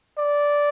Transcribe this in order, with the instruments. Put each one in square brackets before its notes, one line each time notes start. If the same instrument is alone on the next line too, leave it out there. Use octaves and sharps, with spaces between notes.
[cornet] D5